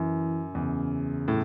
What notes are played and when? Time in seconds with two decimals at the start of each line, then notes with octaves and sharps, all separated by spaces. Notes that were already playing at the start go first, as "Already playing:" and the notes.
Already playing: F#2 E3
0.54 E2 C#3
1.28 A2